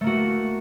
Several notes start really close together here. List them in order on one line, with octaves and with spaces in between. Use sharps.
A3 A#3 F#4